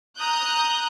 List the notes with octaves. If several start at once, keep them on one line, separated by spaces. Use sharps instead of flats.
A#5 D#6 F#6 G6